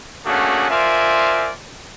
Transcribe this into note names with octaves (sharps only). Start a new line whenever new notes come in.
A3 A#3 C#4 D4 F#4 G#4
F4 A#4 C5 D5 E5 G#5